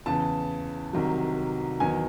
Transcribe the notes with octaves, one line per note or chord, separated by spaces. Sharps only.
E2 C#3 E3 A5
C2 C3 D#3 F#3
E2 D#3 F#3 G#5